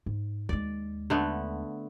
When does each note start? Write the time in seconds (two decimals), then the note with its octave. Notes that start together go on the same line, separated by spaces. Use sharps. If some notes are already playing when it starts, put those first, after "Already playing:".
0.06 G#2
0.49 D#2 G#3 D5
1.10 D3 A3 B3